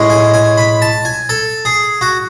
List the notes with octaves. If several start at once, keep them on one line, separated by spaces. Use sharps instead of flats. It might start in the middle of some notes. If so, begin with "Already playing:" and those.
Already playing: A2 G#3 C#4
G#5
G#5
B5
A5
G#5
A4
G#4
F#4